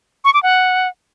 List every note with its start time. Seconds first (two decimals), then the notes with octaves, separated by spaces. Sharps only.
0.25 C#6
0.34 D6
0.43 F#5